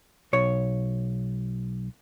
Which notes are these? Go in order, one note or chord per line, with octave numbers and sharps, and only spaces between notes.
B1 C#5